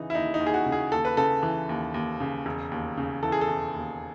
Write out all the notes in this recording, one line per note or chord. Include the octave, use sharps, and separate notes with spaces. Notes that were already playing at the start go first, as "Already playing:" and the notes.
Already playing: C#3 E3 D#4
E4
D#2 D#4
D#4
D#2
G#4
F#4
C#3
G#4
D#2 A4
B4
C#3 A4
E3
D#2
D#2
C#3
E1
D#2
C#3
E3 A4
G#4
A4
E1
D#2